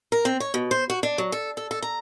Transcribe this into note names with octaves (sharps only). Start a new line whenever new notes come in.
A#4
C4
C#5
B2
C5
F#4
D4
F#3
A4
A4
A4
A#5